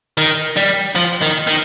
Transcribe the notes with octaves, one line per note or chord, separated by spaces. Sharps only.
D#3
G3
F3
D#3
D#3